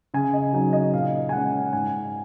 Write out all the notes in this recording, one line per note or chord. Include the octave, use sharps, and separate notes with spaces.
C#3 G#5
D#5
F#3 C4 D#4
D#5
A#2 F5
G#5
G#3 C#4 F#5
G#2 G#5